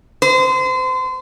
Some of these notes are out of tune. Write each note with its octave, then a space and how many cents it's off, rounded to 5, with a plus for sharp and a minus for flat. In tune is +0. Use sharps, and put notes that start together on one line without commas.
C5 -30